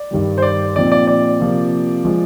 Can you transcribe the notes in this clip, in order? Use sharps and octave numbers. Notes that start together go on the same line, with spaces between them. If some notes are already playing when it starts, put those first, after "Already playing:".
Already playing: D5
G2 D#3 G3
C5
D5
A#2 F3 C4 D#4 D5
D5
D5
C3 F3 A#3
F3 G#3